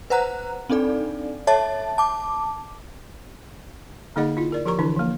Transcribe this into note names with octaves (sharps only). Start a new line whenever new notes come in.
B4 C5 F#5 A#5 F#6
C4 D4 D#4 A4 D5
A4 C#5 E5 A5 A6
A5 D6
D3 A#3 D#4 G#4 D#5 F#5
E4 F4
A#4 D5
F3 G4 A#4 A#5 C#6
D3 E3 D4 E4
F3 A#3